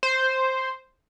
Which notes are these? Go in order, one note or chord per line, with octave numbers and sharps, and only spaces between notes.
C5